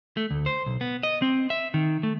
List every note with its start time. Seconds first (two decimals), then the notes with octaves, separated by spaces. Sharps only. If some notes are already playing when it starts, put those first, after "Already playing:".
0.17 A3
0.31 D2
0.46 C5
0.66 B1
0.81 B3
1.03 D#5
1.22 C4
1.50 E5
1.74 D#3
2.03 A3